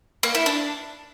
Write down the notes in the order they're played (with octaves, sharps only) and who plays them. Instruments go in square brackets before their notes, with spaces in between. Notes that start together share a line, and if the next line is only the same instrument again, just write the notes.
[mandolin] A#3
E4
D4